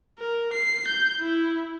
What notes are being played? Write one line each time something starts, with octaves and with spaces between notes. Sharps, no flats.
A#4
C7
G6
E4